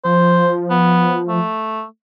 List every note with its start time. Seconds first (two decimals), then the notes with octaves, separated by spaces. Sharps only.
0.05 F3 C5
0.70 B3
1.29 A3